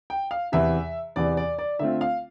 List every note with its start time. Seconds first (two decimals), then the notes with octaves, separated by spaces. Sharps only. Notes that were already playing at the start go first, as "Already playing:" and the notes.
0.10 G5
0.31 F5
0.52 E2 C3 E3 E5
1.16 E2 C3 E3 D5
1.37 D5
1.59 D5
1.79 D3 A3 C4 F4 E5
2.01 F5